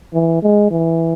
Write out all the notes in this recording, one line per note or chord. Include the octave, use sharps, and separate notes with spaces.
E3
G#3
E3